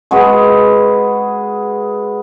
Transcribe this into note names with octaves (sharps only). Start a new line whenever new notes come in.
G#3 F#4 G#4 B4